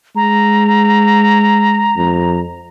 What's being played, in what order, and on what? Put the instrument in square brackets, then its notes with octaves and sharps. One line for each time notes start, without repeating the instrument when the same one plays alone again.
[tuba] G#3 [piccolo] A#5
[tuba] F2